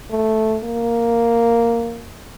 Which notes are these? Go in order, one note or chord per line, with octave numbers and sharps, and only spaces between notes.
A3
A#3